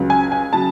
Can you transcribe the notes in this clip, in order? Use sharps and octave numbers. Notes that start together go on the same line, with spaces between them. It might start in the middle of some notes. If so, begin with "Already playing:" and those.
Already playing: C#2 C#3 F#3
G#5
G#5
C#3 F#3 A5